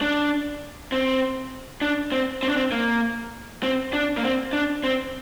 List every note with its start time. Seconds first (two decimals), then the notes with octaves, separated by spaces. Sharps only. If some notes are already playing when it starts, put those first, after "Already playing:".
0.01 D4
0.92 C4
1.81 D4
2.12 C4
2.43 C4
2.49 D4
2.57 C4
2.72 A#3
3.63 C4
3.93 D4
4.17 A#3
4.23 C4
4.53 D4
4.84 C4